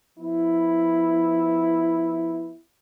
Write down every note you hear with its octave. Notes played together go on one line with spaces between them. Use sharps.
F3 B3 E4